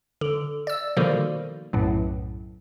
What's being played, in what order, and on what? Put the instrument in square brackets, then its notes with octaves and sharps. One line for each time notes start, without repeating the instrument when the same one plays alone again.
[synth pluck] D3
D5 E6
B2 D3 D#3 F3 G3 A#3
B1 F#2 A2